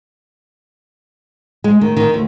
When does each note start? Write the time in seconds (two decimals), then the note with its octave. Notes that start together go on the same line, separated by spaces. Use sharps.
1.64 G#3
1.81 D#3
1.97 D#3
2.14 D2